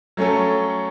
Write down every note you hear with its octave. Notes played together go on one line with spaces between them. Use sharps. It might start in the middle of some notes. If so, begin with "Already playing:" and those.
F#3 A3 C#4 A4